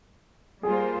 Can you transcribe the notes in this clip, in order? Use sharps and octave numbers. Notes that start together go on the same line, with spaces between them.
G3 A#3 F4 G#4 C5